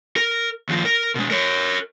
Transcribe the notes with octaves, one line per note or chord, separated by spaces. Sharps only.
A#4
D#2 F3
A#4
B2 G#3
A#4 C#5